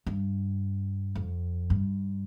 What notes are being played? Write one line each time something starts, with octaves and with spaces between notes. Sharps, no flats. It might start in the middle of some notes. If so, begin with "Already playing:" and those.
G2
F2
G2